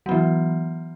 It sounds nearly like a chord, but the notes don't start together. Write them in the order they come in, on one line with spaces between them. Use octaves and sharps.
F#3 B3 E3